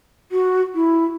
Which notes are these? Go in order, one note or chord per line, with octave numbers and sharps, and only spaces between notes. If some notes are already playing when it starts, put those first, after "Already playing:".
F#4
E4